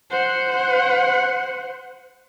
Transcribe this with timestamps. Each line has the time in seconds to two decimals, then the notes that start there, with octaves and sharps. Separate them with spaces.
0.11 C5 F#5